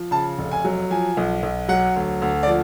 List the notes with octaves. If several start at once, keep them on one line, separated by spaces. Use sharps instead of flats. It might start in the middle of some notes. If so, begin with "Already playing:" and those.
Already playing: F3
C#3 A5
F1
G#5
F#3
F3 G#5
B1
B1
F#3 F#5
D2
D2
D5
F3